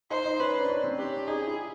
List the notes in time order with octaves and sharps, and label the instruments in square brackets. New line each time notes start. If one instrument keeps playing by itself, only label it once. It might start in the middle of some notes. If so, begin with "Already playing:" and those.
[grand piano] D#4 [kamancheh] C5
[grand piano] D#4
[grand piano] C#4 [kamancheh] B4
[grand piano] D4
C#4
C4
[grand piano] C#4 [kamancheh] G4
[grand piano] D4
[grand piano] D#4 [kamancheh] G#4
[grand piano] E4